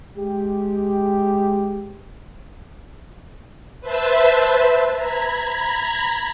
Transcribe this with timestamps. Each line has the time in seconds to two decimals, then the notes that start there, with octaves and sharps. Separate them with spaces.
0.17 G#3 G4
3.81 B4 C5 E5 A5
4.94 A#5 B5 G#6